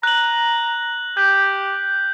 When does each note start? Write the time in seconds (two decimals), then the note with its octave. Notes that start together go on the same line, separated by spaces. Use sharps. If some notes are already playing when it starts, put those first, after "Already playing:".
0.03 A#5 F#6 F#7
1.17 G4 G6